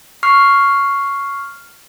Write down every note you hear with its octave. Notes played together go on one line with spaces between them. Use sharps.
C#6 F6 C7